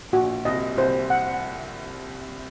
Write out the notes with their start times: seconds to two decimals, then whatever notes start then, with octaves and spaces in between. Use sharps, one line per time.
0.13 A#1 A#2 F#4
0.45 C2 C3 D#5
0.77 C2 C3 C5
1.10 F#5